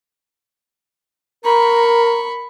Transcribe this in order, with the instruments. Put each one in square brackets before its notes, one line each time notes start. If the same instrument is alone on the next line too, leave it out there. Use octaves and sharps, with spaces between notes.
[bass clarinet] A#4 [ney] A#5 [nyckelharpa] B5 C#6